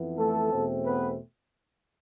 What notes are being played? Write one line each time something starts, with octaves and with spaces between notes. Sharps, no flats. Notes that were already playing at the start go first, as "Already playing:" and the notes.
Already playing: F2 E3 B3
A3 A4
E2 B2 A3 C4
B3 B4